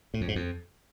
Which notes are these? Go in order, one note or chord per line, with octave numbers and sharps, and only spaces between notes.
A2
F2
G#2
F2